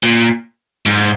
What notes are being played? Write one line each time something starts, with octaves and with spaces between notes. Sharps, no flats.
A#2
G#2